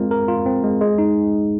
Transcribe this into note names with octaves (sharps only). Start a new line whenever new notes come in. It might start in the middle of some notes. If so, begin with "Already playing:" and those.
Already playing: G#3 C4 F4 A#4
A#4
F4
C4
G#3
G#3
D#4